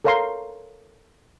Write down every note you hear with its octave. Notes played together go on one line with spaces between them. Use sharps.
A4 A#4 C#5 F5 A#5 C6